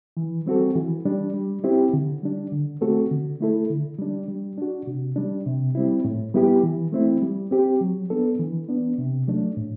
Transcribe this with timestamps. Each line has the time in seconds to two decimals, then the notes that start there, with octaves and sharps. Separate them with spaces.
0.17 E3
0.46 G3 C4 F#4 A4
0.76 E3
1.05 G3 D4
1.34 G3
1.64 C4 E4 G4
1.93 D3
2.23 G3 D4
2.52 D3
2.81 A3 C4 F#4 A4
3.11 D3
3.40 A3 E4 A4
3.70 D3
3.99 G3 D4
4.28 G3
4.58 D4 F#4
4.87 C3
5.16 G3 D4
5.46 C3
5.75 G3 C4 E4
6.05 A2
6.34 G3 B3 E4 G4
6.63 E3
6.92 A3 C4 E4
7.22 G3
7.51 C4 G4
7.81 F#3
8.10 B3 D4 A4
8.40 E3
8.69 B3 D4
8.98 C3
9.28 F#3 A3 D4
9.57 A2